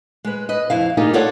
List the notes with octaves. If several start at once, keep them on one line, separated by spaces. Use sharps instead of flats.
G#3 B4
B4 D#5
F2 E4 F5
G3 A#3 D#4 F4 G4 G#4
F4 A4 C#5 D5 F#5